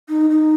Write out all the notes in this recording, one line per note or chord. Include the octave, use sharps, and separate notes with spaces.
D#4
D#4